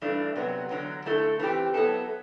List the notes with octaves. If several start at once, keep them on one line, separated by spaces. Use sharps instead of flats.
G2 E3 A3 D4
C3 F#3 B3
E2 D3 F#3
D3 A3 E4 A4
E3 G3 C4 G4
F#3 B3 E4 A4